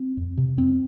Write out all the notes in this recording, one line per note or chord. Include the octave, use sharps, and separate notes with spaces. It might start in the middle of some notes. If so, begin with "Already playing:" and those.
Already playing: C4
F2
C3
F2 C4